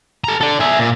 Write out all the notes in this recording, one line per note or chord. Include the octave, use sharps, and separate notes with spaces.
A4 A#5
A4 D5
G#4 E5
A#2